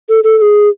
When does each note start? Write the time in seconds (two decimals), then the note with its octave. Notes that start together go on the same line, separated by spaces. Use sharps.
0.09 A4
0.24 A4
0.38 A4
0.42 G#4